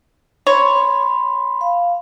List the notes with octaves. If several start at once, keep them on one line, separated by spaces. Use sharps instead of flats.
C#5 B5 C6
F5